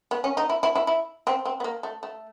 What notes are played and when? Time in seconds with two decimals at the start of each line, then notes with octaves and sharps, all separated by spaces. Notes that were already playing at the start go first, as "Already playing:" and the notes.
0.11 B3
0.24 C#4
0.37 D#4
0.49 E4
0.63 E4
0.75 E4
0.87 E4
1.27 C4
1.45 C4
1.60 B3
1.64 A#3
1.83 A3
2.03 A3